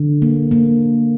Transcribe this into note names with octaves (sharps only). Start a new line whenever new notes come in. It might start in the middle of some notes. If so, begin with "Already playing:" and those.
Already playing: D3
A#3
A#3